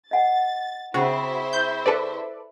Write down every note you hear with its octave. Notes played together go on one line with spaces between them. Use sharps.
D#5 F#5 A6
C#3 C4 E4 F#4 C5 E5
G6
A4 B4 D5